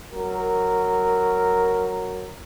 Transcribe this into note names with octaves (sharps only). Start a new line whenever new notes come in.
F#3 A#4